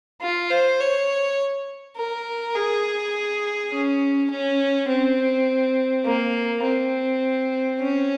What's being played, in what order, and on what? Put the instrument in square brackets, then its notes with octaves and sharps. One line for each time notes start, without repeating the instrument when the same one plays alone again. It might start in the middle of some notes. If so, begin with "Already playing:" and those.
[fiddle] F4
C5
C#5
A#4
G#4
C#4
C#4
C4
A#3
C4
C#4